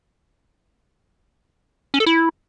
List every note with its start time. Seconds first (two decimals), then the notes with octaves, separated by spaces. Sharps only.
1.94 C#4
2.00 A4
2.06 E4